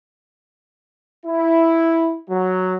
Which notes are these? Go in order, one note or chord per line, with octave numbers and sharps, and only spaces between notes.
E4
F#3